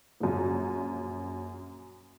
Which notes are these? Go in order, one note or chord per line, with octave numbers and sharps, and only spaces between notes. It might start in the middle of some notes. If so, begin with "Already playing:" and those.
A#1 F#2